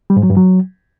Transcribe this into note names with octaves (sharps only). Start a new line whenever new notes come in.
G3
G#2
F#3
G2
F#3